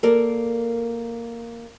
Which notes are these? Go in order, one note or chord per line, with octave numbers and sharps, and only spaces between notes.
A#3 A4 A#4 D5